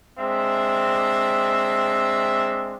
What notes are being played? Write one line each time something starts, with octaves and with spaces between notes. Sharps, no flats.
G#3 C4 D4 E5